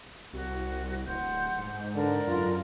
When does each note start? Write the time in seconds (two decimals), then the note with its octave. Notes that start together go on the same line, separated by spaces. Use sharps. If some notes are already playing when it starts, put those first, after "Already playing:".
0.33 C2 F#4
1.07 D1 F#5 C6 G6
1.58 G#2
1.95 D3 A#4 B4 D5
2.27 F#2 F4